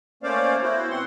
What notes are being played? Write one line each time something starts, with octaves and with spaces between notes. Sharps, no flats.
A3 A#3 C#4 C5 D5 F5
B3 E4 F#4 C5
B2 C4 F#5 C6